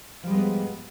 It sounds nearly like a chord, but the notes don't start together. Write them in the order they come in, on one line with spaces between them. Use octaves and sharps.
F3 G3 G#3 B3 G#2